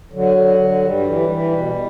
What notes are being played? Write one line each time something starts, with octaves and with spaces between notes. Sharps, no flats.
D3 F#3
D3
D3
G2 G3
E3
E3
B2